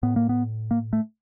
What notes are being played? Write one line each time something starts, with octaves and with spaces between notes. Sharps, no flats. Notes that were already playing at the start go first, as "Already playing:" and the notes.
A2 B3
A#3
B3
A#3
A3